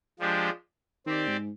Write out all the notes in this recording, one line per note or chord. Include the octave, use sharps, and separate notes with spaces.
F3 G#3 D4 G4
D#3 C4 G4 D5
G#2